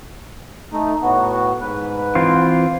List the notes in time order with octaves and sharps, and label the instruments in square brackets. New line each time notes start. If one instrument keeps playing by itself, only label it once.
[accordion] A3 D#4
A2 B3 F#4
G#2 B4
[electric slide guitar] E3 C4 F4